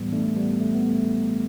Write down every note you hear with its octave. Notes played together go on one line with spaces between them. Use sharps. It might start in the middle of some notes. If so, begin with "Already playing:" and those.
Already playing: A2 E3 G3 B3
A3 D4
G3 B3
A3
B3
A3